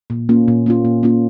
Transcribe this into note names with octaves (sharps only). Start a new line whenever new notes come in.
A#2
A#3 C#4 F4
A#2
A#3 C#4 F4
A#2
A#3 C#4 F4